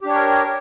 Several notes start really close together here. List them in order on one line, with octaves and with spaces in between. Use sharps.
G4 D4 C#5 A#4